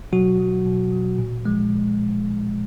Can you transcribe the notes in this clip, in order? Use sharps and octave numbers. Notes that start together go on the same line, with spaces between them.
B2 F#3 F#4
F#3
B2
F#3
A#2
F3 G#3